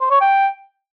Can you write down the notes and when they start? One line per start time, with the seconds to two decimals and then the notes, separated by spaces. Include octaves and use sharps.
0.01 C5
0.11 C#5
0.21 G5